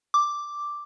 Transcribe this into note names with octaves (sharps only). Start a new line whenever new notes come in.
D6